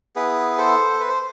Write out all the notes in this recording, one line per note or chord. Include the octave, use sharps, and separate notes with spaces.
B3 E4 G#4 B4
A4 C5
B4
C5